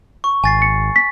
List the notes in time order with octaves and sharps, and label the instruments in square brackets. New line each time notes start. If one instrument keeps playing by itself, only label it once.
[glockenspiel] C#6
[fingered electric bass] G#1 [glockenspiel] G#5 A6 C7
[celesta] C#7
B6